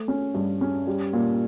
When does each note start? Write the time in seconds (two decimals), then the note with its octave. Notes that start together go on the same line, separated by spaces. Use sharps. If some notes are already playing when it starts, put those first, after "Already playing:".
Already playing: A3
0.08 C#4
0.34 G2
0.61 C#4
0.87 G3
1.13 A#2